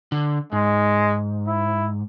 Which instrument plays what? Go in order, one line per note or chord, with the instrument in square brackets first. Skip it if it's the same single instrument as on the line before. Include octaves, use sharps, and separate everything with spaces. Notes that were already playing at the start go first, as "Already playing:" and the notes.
[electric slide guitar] D3
[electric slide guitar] G#2 [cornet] G#3
[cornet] E4